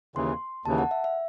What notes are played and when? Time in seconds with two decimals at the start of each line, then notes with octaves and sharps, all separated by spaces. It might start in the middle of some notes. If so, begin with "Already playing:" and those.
0.15 D#2 C#3 E3 C6
0.65 D#2 C#3 E3 A5
0.78 F#5
0.91 E5
1.04 E5